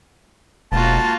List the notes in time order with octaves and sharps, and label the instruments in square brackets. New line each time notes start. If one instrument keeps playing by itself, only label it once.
[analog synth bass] E1 [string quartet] A#3 F4 F#4 [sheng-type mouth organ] A5